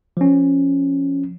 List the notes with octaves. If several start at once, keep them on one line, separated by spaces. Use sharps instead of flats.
F3 C#4